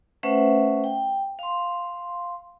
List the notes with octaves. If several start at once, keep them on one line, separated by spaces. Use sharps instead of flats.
A3 C#4 B4 C5 E5 F#5
G5
F5 C6